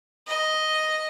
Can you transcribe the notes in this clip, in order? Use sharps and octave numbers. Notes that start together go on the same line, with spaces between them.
D#5